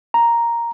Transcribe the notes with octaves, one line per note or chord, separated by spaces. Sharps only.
A#5